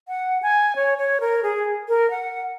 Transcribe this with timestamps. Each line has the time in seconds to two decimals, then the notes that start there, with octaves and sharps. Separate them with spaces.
0.08 F#5
0.42 G#5
0.76 C#5
0.98 C#5
1.21 A#4
1.43 G#4
1.89 A#4
2.11 F#5